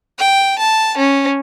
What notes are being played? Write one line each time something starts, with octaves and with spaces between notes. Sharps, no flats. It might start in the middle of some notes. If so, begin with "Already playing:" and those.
G5
A5
C#4